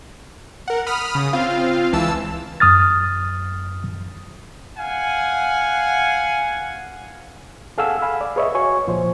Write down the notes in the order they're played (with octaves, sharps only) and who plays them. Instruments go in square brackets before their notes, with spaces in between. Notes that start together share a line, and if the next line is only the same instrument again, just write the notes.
[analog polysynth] A#4 F#5
B5 D#6 F6
C#3 D#6
C4 F4 F5
C#2 E3 A5 E6
[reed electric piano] F#2 D#6 F6 A6
[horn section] F5 F#5 G#5
[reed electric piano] G#4 A4 F5 F#5 G#5 E6
F5 G#5 B5
D5
G#4 B4 C#5 D#5 E5
F#4 C#5 G#5 C#6
C#2 A#2 F3 C5